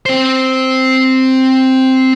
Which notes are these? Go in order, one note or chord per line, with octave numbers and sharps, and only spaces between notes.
C4 C5